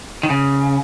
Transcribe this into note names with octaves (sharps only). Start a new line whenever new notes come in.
D#3
C#3